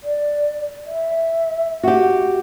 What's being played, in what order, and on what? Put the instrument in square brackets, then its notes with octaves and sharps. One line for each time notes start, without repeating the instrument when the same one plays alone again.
[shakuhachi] D5
E5
[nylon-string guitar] F#4 G4